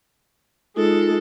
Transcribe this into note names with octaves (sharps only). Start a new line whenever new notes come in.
G#3 D#4 F4 A4